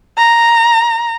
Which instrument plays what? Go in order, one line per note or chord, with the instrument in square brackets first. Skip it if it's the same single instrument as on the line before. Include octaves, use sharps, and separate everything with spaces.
[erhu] A#5